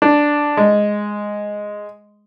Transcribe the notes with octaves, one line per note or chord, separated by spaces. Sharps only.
D4
G#3